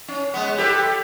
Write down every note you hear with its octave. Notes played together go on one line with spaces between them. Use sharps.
C#4
G#3 B3
G4 A4 B4